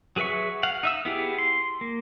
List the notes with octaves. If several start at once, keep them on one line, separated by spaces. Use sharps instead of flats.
F#3 G#4 B4 E5 C#6
F5 F#5
D#4 E5 E6
B3 E4 G4 G#4
C6
A#3